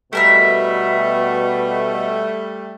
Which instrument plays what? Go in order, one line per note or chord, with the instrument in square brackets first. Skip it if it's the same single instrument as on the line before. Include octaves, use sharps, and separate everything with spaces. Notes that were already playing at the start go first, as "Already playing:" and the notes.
[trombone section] B2 [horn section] G3 A3 [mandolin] E4 A#4 E5